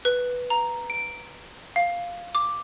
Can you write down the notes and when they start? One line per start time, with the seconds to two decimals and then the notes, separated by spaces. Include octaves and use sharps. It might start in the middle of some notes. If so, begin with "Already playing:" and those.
0.05 B4
0.50 A#5
0.90 D7
1.76 F5
2.35 D6